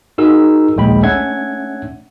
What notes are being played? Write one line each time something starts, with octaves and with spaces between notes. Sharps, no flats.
D#4 F#4 G#4 A#4 E6
A#1 D#2 G#3 G5 B5
A3 C#4 D4 E5 F#5 G#6